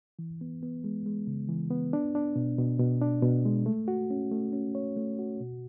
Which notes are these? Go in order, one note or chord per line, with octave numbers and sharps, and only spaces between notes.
E3
B3
B3
G#3
G#3
C#3
E3
B3
D4
D4
B2
B2
B2
D4
B2
G#3
A3
F#4
C#4
A3
C#4
C#5
A3
F#4
B2